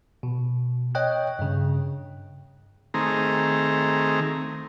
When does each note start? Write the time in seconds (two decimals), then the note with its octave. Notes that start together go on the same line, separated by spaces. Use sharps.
0.23 B2
0.95 C#5 D#5 G5 F#6
1.39 G2 C#3
2.94 D#3 A3 C4 G#4 A#5